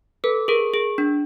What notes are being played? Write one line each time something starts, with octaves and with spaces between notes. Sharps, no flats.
A4 B4
G#4 A#4
G#4
D4